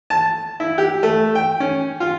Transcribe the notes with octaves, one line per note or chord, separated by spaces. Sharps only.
A5
E4
G4
A3
G5
C#4
F4